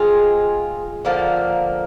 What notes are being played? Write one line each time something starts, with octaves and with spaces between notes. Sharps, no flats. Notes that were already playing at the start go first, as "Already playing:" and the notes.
Already playing: G#3 C4 F4 G#4
D3 F3 A#3